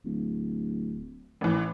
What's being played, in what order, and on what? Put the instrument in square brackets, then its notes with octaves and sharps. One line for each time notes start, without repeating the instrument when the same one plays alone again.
[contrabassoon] D1
[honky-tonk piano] A1 E3